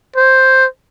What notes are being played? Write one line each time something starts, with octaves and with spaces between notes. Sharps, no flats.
C5